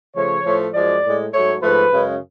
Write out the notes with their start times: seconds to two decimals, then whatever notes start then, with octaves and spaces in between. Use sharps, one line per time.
0.15 C#3 F3 A3 C#5
0.44 A2 F3 A3
0.74 F#2 F3 G#3 D5
1.04 A2 G#3
1.32 G#2 F#3 A3 C#5
1.62 G#2 F3 A3 B4
1.92 F#2 C#3 G#3